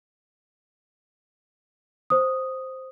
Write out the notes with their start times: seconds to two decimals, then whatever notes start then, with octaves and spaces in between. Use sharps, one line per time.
2.10 C5 D#6